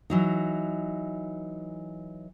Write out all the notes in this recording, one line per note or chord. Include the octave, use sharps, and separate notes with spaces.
E3 F#3 D#4